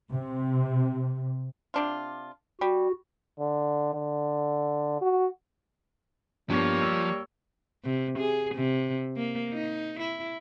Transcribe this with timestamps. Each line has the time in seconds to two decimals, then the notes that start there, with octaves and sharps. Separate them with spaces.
0.12 C3
1.74 C3 D4 F4
2.61 G3 F#4
3.39 D3
3.94 D3
5.02 F#4
6.50 G2 F3 G3 A#3 B3 C#5
6.81 E6
7.84 C3
8.19 G#4
8.55 C3
9.17 A#3
9.53 D#4
10.00 E4